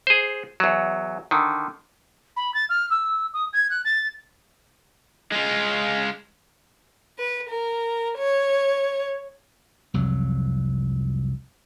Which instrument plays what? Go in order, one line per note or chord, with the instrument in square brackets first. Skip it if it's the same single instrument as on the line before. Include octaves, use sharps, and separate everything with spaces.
[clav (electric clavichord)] G#4 C5
E2 F#3
D3 D#3
[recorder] B5
A6
F6
E6
D#6
G#6
F#6
A6
[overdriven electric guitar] G#3 F4
[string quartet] B4
A#4
C#5
[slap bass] C2 F2 F#3